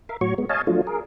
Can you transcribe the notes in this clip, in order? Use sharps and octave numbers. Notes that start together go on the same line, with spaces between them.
A#4 E5 F5
A2 F#3 F#4 C#5 C#6
G#3 B3
C#5 D#5 F5 G#5 A5
F3 F#3 A3 D4 F4
G#4 A#4